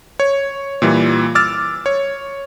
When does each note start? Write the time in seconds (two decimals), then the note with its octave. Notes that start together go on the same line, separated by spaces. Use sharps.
0.20 C#5
0.82 A#2 E3 G3
1.35 D6 E6 F6 A6
1.86 C#5